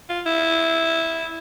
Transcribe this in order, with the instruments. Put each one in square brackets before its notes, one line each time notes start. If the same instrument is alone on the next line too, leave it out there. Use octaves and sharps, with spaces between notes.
[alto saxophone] F4
E4